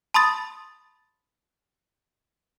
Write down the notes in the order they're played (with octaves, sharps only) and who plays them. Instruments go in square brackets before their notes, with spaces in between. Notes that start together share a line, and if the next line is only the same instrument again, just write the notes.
[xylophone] A5 B5 C6 D#6 A6